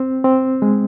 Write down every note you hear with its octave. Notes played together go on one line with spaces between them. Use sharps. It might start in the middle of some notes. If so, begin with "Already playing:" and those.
Already playing: C4
C4
G#3